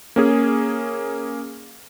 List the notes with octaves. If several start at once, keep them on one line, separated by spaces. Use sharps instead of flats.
A#3 C#4 G#4